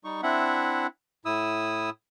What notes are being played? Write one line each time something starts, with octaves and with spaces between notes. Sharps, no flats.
G3 D#4 C#6
C4 D4 E4 E5 F#5
A2 E4 D#6 E6